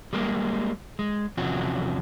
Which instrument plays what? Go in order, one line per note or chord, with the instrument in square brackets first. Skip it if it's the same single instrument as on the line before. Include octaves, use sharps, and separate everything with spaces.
[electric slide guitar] G3 G#3 A#3
G#3
E2 C3 F3 C#4 F#4